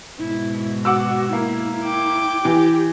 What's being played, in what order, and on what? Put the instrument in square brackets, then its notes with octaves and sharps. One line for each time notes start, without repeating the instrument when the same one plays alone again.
[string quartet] G#2 B2 [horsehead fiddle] E4
[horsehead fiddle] F#4 [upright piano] F#5 D6 E6
[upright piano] A#3 [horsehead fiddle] E4
[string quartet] G5 D6
[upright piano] E3 [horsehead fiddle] G4